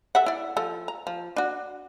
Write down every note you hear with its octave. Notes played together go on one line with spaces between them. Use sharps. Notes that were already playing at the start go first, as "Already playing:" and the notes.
A4 E5 F#5
E4 D5
F3 A4
A#5
F3
D4 F#4